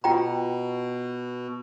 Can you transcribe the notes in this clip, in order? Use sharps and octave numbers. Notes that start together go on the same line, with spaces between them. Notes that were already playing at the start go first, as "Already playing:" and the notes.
B2 F4 G5 A#5